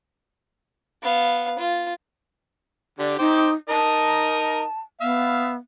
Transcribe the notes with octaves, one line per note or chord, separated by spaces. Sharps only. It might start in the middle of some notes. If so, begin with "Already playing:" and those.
B3 F5
F4
D3 G4 D5
D#4 C5 G5 D6
D#4 A#4 D#5 A5
B3 E5 F5